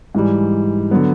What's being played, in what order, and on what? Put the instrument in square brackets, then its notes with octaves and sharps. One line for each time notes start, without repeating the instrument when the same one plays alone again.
[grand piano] G#2 E3 G3
D3 F#3 B3